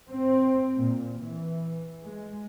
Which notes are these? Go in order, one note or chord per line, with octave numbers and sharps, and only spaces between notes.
C4
A#2
E3
G#3